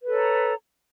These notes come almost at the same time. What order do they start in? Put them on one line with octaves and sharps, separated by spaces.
B4 A4 C#5 A#5